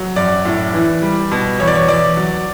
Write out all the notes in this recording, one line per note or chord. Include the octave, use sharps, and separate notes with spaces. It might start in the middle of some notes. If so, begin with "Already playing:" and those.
Already playing: F#3
F#2 D5
A2
E3
G3
B2
E2 C#5
D5
C#5
E2 D5
F#3